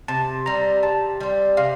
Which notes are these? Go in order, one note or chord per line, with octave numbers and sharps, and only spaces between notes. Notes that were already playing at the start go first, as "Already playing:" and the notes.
C3 A5
G3 C4 A#5
C3 A5
G3 C4
C3 F5